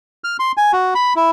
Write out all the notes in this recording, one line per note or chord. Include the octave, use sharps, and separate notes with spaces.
F6
C6
G#5
F#4
B5
E4